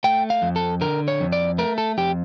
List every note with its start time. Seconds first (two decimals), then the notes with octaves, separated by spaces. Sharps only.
0.04 A3 G5
0.30 F5
0.42 F2
0.56 A4
0.81 D3 A#4
1.08 C#5
1.20 F2
1.32 D5
1.58 A3 A#4
1.78 A4
1.97 F2 G4